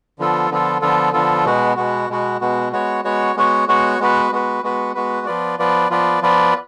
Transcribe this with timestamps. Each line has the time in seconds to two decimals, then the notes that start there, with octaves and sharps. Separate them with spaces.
0.19 D3 F3 B3 F4 A4
0.50 D3 F3 B3 F4 A4
0.82 D3 F3 B3 F4 A4
1.13 D3 F3 B3 F4 A4
1.45 B2 G#3 B3 F#4
1.77 B2 G#3 B3 F#4
2.10 B2 G#3 B3 F#4
2.41 B2 G#3 B3 F#4
2.72 G#3 B3 F#4 C#5
3.04 G#3 B3 F#4 C#5
3.36 G#3 B3 F#4 C#5
3.68 G#3 B3 F#4 C#5
3.99 G#3 B3 F#4 B4
4.32 G#3 B3 F#4 B4
4.63 G#3 B3 F#4 B4
4.95 G#3 B3 F#4 B4
5.26 F3 B3 F4 B4 D5
5.59 F3 B3 F4 B4 D5
5.91 F3 B3 F4 B4 D5
6.22 F3 B3 F4 B4 D5